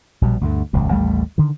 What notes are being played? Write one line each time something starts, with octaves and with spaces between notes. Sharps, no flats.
A#1 B2 G3
D2 G2 D3
D#1 C#2 F#2
A1 D#2 G3 A3
D3 D#3